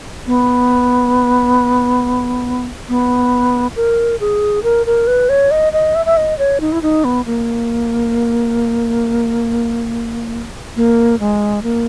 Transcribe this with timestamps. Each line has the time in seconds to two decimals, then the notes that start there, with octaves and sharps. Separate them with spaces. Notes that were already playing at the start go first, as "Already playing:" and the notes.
0.27 B3
2.89 B3
3.76 A#4
4.20 G#4
4.63 A#4
4.86 A#4
5.07 B4
5.29 C#5
5.51 D#5
5.73 D#5
5.95 E5
6.06 E5
6.17 D#5
6.39 C#5
6.61 D#4
6.72 E4
6.82 D#4
7.04 B3
7.26 A#3
10.76 A#3
11.20 G#3
11.63 A#3